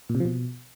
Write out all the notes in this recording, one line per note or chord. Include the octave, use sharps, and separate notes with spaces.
A#2
C3
F3
B2